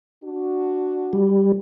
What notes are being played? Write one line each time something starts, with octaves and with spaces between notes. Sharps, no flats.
D4 F#4
G3